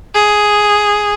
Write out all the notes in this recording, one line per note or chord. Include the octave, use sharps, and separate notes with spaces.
G#4